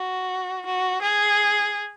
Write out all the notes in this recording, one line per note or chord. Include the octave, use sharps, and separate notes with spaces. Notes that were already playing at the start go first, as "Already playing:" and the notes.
Already playing: F#4
F#4
G#4